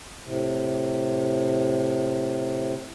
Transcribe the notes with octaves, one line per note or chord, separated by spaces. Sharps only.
A2 C3